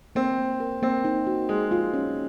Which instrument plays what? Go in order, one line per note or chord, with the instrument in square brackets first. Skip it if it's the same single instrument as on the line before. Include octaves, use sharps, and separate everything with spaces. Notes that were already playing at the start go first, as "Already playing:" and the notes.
[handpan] A#3 [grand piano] C4
[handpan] A#3
A#4
[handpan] A#3 [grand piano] C4
[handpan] D#4
F#4
[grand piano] G#3 [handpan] A#3
[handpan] F4
C#4